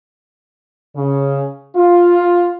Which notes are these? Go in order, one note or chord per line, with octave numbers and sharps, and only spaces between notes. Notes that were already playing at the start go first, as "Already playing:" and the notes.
C#3
F4